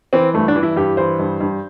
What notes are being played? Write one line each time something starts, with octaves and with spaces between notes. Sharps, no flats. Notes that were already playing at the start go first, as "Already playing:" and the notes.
E3 C4
G2 A3
D4
E3
E4
G2 G4
E3 C5
G2
G2